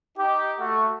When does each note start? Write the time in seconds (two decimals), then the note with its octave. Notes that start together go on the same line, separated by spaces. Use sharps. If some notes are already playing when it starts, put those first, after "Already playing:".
0.17 D#4 G4
0.59 A3 F#4